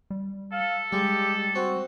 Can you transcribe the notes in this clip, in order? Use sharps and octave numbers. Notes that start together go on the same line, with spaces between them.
G3
A4 F5
G3 G#3 G4
C4 F#4